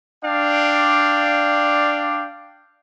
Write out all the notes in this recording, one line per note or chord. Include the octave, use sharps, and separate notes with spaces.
D4 D5 F5 G5